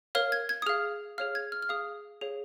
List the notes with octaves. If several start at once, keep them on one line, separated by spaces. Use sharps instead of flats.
A#4 C#5 F5 F6
G#6
G#6
D#6
G#4 F5 F6
G#4 C#5 F5 F6
G#6
F6
F6
G#4 F5 D#6
G#4 C#5 F5